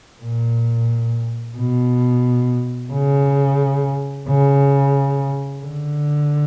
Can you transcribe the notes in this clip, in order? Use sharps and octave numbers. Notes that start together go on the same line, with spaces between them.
A#2
B2
C#3
C#3
D3